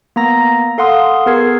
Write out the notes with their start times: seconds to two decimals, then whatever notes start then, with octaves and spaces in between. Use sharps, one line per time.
0.16 A#3 B3 A#5 A#6
0.78 A4 F5 F#5 C6 D#6
1.26 B3 G#4 A#4 G#6 C7